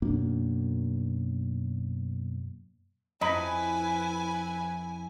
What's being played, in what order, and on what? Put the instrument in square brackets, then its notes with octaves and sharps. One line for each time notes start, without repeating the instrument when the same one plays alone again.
[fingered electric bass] F#2 B2 A#3 D4
[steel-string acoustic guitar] F2 [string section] E4 G#5 [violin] B4 [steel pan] D#5 A#5 B5